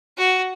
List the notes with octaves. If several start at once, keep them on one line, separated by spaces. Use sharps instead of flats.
F#4